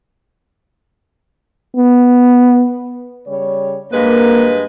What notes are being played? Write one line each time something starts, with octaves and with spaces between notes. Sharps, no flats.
B3
C#3 G3 C#5
G2 G#3 A#3 B4